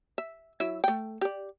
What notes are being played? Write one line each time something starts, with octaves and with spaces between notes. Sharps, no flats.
E5
F#3 E4 E5
A3 G5
G4 D5